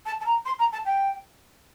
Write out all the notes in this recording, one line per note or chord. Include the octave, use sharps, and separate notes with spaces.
A5
A5
A#5
C6
A#5
A5
G5